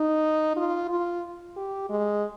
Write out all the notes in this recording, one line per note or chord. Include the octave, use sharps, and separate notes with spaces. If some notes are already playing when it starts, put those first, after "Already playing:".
Already playing: D#4
F4
F4
G4
G#3